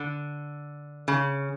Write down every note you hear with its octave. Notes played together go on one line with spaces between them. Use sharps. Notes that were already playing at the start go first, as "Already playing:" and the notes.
Already playing: D3
C#3